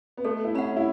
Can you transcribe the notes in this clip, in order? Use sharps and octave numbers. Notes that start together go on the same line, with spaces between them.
B3
A3 A4
E4
C#4 F#5 B5
E4